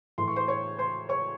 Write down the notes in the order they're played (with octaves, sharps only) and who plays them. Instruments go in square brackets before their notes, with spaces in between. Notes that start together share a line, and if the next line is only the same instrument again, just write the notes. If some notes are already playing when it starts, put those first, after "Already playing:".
[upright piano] A2 E3 C6
C#6
C5 C6
C#5 C#6
C5 C6
C#5 C#6